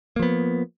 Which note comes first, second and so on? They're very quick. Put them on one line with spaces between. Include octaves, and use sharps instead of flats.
A#3 F3 B3